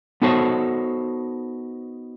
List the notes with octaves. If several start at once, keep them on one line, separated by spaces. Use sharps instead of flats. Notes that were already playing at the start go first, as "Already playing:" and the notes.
B3 D#4 F#4 A4 C5 C#5